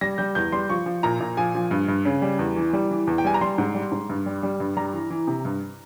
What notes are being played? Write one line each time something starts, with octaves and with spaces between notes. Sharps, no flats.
G3 A#6
G3 G6
E2 G6
G3 C6
F3 C#6
F3
A#2 A#5
A#2
F3 G#5
F3
G2
G2
C#3
G3
E2
E3
G3
E3
E2
G5
G3 G#5
A#5
G3 C6
G#2
G3
G#2
G2
G3
G3
G2
G3 A#5
E3
E3
C3
G2